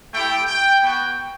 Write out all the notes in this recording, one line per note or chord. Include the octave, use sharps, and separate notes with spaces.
A3 E4 G4 G5
G5
B3 F#4 G5